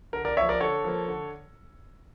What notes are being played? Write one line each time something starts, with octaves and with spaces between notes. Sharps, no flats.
D3 A#4
A#4 D5
F3 A#3 C#5 E5
A#4 D5
D3 A4 C#5
F3 A#3
D3